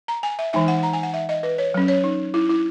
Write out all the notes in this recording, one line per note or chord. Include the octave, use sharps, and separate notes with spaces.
A#5
G#5
E5
E3 G#3 D#4 E5
F#5
A#5
G#5
F#5
E5
D#5
B4
C#5
F#3 C#4
C#5
D#4
E4
E4